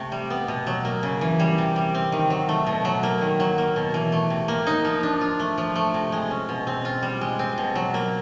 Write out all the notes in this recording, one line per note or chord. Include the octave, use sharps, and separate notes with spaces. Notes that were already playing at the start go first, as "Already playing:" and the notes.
Already playing: C3 A3
G3
B3
B2
F#3
A#3
C#3
E3
G3
C3
G3
C4
D#3
F#3
A3
B2
F#3
A#3
D#3
F#3
A#3
B2
E3
A3
C3
A#3
D#4
F3
D4
F4
A3
F3
A3
C3
G#3
C#4
B2
C4
F4
G3
G#3
C4
B2
F#3
A#3